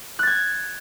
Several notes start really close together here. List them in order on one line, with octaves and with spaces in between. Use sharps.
F#6 A6 G#6